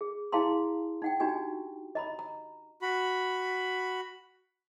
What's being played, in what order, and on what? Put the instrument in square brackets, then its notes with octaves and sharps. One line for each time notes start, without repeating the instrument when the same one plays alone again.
[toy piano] G#4
E4 G#4 F5 A5 A#5 C6
D#4 F#5 G5
D4 D#4 F#4 G4 G#5
D#5 A#5 B5
A#5
[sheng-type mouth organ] F#4 B5